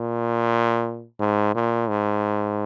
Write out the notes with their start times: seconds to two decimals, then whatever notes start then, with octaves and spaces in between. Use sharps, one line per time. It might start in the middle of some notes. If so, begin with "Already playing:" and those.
Already playing: A#2
1.20 G#2
1.54 A#2
1.89 G#2